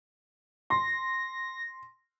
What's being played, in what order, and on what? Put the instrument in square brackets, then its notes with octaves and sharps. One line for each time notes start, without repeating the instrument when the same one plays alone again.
[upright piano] C6 [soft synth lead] A#6